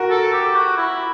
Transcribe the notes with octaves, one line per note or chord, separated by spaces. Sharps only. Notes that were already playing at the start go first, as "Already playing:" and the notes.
Already playing: F#4 A#4
A4
G4
F#4
E4